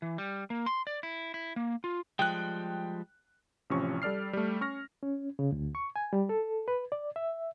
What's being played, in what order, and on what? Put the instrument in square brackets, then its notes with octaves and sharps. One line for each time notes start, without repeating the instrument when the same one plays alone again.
[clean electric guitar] E3
G3
A#3
C6
D5
E4
E4
A#3
F4
[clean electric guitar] F3 G3 G#3 [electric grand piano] G5 F#6
[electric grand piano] A1 C3 F3 C#4 C#6
G3 A4 D5 F6 C7
G3 A3
C#4 C#6 F6 A#6
[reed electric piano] C#4
C#3
D2
C#6
G#5
G3
A4
B4
D5
E5